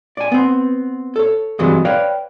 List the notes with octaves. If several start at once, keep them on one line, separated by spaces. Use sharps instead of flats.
D5 G#5
B3 C4
A4 C#5
G2 C3 E3 F#3 G#3
B4 C#5 D5 F5 G5